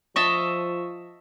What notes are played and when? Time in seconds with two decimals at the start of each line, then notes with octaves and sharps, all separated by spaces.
0.16 F3 D#5 E5 A5 C#6